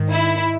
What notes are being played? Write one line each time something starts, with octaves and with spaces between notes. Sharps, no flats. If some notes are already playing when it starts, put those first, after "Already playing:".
Already playing: G#2 D#3
E4